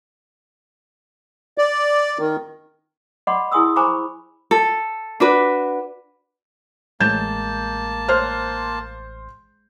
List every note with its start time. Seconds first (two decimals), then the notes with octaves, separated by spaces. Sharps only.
1.58 D5
2.19 D#3
3.27 D5 D#5 F#5 B5 C6 D6
3.51 E4 G#4 G#5 C6 D#6 E6
3.76 C5 G#5 A#5 B5 C#6 D6
4.51 A4
5.20 D4 F#4 B4
7.00 A1 G#3 A#3 A5 G6 A6 E7
8.09 C5 F6 F#6